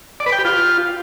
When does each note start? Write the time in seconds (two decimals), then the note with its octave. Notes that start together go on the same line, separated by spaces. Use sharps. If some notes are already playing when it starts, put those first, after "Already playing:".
0.20 D5
0.26 B4
0.32 G5
0.39 G4
0.45 F4